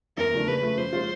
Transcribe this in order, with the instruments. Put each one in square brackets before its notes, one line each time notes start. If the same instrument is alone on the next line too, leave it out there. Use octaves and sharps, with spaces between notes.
[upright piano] E2 [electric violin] A#4
[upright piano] C#3 F3 A3 D4
[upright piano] C#3 [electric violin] B4
[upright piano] F3 A3
[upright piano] F3 [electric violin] C5
[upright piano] G#3 C#4 F4